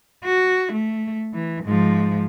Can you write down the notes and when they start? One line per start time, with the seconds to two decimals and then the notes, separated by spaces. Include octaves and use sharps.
0.24 F#4
0.73 A3
1.33 E3
1.64 G#2 F3